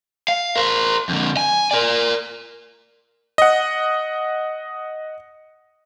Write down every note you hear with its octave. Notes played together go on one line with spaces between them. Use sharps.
F5
A#4 C5
F2 D3
G#5
A#4 D5
D#5 F#5